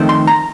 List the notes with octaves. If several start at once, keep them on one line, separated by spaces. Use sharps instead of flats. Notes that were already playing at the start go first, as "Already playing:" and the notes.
Already playing: F2 D#3 A3 C4
C6
A#5